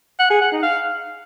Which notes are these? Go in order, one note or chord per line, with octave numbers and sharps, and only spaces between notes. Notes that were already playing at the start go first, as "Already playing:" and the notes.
F#5
G#4
F#5
D#4
F5